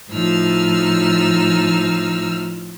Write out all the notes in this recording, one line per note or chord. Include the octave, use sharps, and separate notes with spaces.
A2 F3 D#4 E6 F6